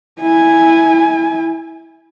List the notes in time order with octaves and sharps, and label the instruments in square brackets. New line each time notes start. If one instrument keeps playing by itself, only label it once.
[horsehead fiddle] E4 G#5